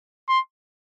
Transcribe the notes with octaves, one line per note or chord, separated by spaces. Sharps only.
C6